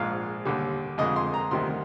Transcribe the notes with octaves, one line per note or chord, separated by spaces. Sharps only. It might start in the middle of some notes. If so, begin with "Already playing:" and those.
Already playing: A#1 G#2 F3 G#3 F5
D#2 D3 G3
F2 D3 G#3 D#5
C6
A#5
D2 C3 D#3 G3 C6